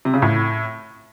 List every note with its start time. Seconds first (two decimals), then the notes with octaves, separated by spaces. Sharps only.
0.05 C3
0.14 C#3
0.22 A2